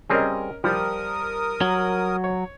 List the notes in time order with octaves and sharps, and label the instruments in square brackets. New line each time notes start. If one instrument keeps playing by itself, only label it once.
[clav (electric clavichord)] G3 C4 G#4 [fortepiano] C#4 A#4 D#5
[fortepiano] F3 [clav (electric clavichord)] G3 [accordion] A#4 D#6
[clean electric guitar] F#3
[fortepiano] C#5